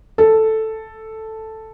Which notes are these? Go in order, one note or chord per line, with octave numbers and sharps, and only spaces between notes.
A4